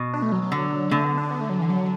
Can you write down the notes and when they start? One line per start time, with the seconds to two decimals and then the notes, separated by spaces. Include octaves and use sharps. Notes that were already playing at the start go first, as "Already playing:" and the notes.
Already playing: B2
0.14 D4
0.22 A3
0.32 F#3
0.42 F#3
0.52 D3
0.91 D3 A3
1.04 B3
1.18 D4
1.31 B3
1.41 A3
1.50 F#3
1.60 E3
1.70 F#3